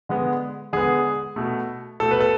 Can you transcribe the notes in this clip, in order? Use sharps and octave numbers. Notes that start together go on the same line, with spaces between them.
D3 G#3 B3
D3 G#3 B3 G#4
B2 A3
B2 A3 A4
B4
A4